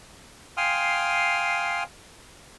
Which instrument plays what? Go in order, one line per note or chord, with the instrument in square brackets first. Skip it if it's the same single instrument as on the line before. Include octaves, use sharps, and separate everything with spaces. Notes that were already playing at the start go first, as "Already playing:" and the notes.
[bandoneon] F5 G5 G#5 C6 D#6 F6